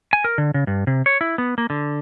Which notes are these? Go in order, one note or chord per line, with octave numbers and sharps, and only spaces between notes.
G#5
A#4
D3
C#3
G2
C3
C#5
E4
B3
A#3
D3